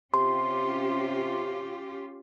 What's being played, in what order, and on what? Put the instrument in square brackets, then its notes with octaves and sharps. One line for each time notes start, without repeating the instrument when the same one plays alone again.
[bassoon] C3 [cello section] C#4 F4 G4 [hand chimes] C6